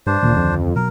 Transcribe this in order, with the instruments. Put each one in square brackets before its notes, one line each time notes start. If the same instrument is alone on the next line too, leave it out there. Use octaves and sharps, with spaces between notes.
[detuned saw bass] G2 [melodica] D4 C5
[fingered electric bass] D2 D#3 C#4 [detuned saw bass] A#2
[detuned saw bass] F2
[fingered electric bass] B2 F#3 B3 [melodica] A#4